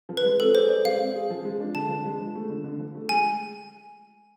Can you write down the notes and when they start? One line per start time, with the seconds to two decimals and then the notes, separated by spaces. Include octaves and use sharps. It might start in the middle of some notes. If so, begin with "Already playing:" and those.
0.09 F3
0.17 B4
0.24 G#3
0.40 C4 A4
0.55 G#4 C5
0.69 D5
0.85 G#3 F5
1.00 C4
1.15 G#4
1.30 F3
1.45 G#3
1.60 D4
1.75 D3 A5
1.89 F3
2.05 G#3
2.20 F3
2.35 A3
2.50 D3
2.64 D3
2.79 F3
2.95 A3
3.09 G#3 G#5